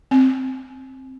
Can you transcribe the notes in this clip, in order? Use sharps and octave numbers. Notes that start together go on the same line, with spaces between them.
C4